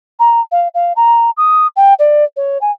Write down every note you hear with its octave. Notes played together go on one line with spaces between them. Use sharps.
A#5
F5
F5
A#5
D#6
G5
D5
C#5
G#5